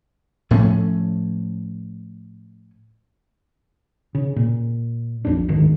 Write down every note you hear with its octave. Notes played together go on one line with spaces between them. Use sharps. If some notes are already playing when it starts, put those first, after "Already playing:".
A2 F3 A3 C#4
C#3
A#2
A#1 F2 D4
D2 G#2 D#3